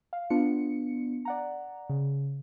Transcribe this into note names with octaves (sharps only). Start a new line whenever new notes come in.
F5
B3 D4 F4 C#7
D5 F#5 A#5
C#3